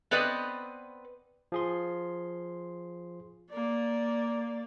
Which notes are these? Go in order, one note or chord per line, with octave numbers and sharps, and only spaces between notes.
B3 C4 B4 D5 D#5
F3 G#4 C6
A#3 D5